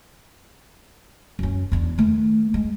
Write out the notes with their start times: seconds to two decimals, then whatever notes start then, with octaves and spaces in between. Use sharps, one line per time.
1.39 F#2 C#4
1.72 E2 D4
1.98 D#3 A3
2.54 G#3